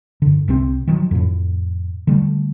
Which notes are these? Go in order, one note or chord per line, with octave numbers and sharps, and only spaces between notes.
F#2 D3
C2 C3 C4
D#3 F3 F#3
F2 A2
D3 G3 A3